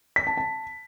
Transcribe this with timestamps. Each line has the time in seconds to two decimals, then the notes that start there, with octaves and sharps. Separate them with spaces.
0.16 B6
0.27 A5
0.37 A5